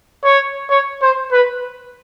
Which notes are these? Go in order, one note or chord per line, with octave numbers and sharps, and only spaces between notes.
C#5
C#5
C5
B4